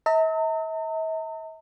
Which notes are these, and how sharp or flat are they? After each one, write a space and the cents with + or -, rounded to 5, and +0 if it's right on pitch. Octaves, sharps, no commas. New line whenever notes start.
E5 -45 A#5 -45